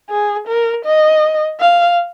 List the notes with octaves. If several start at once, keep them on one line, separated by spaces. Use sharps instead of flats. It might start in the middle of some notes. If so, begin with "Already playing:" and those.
G#4
A#4
D#5
F5